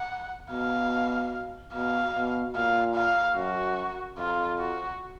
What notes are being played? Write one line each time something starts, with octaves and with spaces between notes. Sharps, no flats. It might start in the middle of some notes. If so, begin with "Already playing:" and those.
Already playing: F#5
B2 F5
B2 F5
B2
A#2 F5
F5
F#2 F#4
F2 F4
F#4